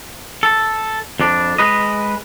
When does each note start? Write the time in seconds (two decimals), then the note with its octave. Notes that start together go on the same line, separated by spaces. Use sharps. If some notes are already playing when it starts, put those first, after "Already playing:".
0.43 A4
1.20 F2 D4
1.58 G#3 B4 D#5